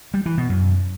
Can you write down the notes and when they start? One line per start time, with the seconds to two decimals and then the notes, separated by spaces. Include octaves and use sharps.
0.14 G3
0.26 E3
0.38 B2
0.50 F#2